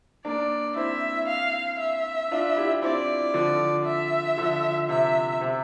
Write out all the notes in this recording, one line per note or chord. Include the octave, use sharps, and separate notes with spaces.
A#3 D4 D5
C4 E4 E5
F5
E5
D4 F4
E4 G4
C4 E4 D5
D3 F3
E5
D3 F3
C3 E5
C3